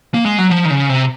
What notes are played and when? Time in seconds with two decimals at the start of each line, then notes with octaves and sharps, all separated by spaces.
0.14 A#3
0.26 G#3
0.38 F#3
0.50 F3
0.65 D#3
0.70 C#3
0.89 C3